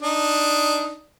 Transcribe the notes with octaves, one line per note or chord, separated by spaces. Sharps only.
D4 D#4